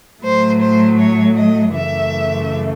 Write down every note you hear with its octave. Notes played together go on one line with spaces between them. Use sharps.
A2 F#3 A3 C5
C5
C#5
D#5
F#2 C#3 E3 A3 E5